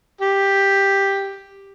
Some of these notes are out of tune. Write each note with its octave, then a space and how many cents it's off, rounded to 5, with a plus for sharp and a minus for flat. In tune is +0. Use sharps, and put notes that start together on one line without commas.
G4 +5